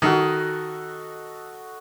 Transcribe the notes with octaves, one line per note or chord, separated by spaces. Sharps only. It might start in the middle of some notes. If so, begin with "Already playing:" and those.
D#3 F#4 A4 D#5